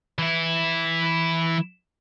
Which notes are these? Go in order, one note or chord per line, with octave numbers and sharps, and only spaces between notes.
E3 E4